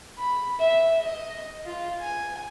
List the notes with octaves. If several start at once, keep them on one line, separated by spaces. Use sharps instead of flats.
B5
E5
D#5
F4
G#5